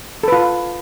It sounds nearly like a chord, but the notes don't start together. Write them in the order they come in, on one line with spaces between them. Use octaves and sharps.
A4 B4 F4